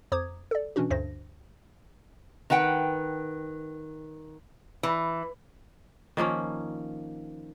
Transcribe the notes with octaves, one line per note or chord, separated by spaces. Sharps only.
F2 C5 A#5 D6 D#6 G#6
A4 D5
B2 E3 C#4 D4 F#4
D2 G2 D3 C5 A#6
D#3 B4 F#5 G5
E3
D#3 F3 A#3 C#4